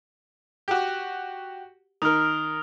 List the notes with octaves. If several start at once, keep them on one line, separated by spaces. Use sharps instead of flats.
F#4 G4
D#3 A#4 D#6 F6